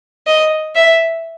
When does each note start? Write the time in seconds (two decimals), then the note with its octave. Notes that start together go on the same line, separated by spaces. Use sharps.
0.27 D#5
0.75 E5